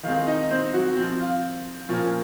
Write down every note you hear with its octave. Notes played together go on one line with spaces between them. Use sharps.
D#3 G#3 C4 F4 F5
D#4 D#5
C4 C5
F#3 F#4
F3 C4
F4
A#2 F3 A#3 C#4